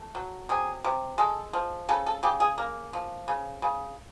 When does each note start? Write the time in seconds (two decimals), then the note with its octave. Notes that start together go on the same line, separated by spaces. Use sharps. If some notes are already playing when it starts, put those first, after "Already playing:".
Already playing: A3
0.15 F#3
0.49 C3 G#4
0.84 C3
1.18 G#3 A4
1.53 F3
1.89 C#3 A4
2.06 A4
2.23 C#3 G4
2.40 G#4
2.58 A#3
2.93 F3
3.28 C#3
3.62 C#3